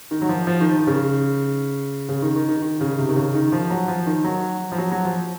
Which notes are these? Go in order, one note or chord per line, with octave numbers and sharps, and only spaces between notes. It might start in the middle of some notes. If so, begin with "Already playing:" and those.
D#3
F#3
F3
F3
D#3
D#3
C#3
C#3
D#3
D#3
D#3
D#3
C#3
C3
D#3
C#3
D#3
F3
F#3
F3
D#3
F#3
F3
F#3
F#3
F3